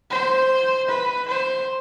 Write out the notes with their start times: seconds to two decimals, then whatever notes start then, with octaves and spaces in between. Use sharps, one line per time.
0.11 C5
0.89 B4
1.28 C5